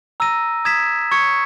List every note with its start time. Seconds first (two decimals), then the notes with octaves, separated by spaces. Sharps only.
0.20 A#5 E6 A#6 D#7
0.65 D#6 G#6 B6 E7
1.12 C#6 G#6 C#7